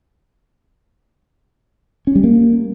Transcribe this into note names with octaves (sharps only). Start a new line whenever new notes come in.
C#4
G3
A#3